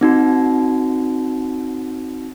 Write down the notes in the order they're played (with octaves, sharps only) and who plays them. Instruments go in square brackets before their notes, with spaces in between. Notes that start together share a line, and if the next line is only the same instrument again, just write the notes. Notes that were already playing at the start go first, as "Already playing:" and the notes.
[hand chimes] C4 D#4 F#4